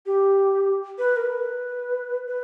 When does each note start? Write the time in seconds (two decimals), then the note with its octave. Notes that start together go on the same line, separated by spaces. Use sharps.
0.06 G4
0.98 B4
1.17 A#4
1.35 B4
2.27 B4